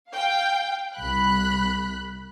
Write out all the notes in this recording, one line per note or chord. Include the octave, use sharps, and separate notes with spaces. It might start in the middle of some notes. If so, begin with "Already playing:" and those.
F5 G5
C2 B5 F#6